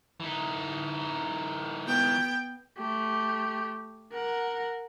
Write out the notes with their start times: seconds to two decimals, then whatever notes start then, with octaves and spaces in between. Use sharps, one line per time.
0.20 E3 D#4
1.85 B3 G5
2.78 A3 G4
4.13 A#4 F#5